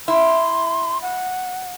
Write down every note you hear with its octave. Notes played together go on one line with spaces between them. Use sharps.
E4 C6
F#5